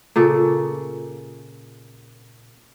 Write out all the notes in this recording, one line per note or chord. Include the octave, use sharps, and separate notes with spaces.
A#2 C#3 A4